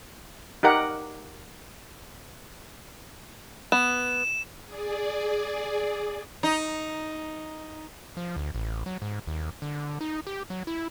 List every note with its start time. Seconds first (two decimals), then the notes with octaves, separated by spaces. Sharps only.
0.63 D#4 G4 A#4 F#5
3.72 B3 E7
4.65 G#4 D5
6.43 D#4
8.17 F3
8.36 D2
8.55 A1
8.86 F#3
9.02 G#2
9.27 D#2
9.62 D3
10.01 D#4
10.27 G4
10.50 F#3
10.67 E4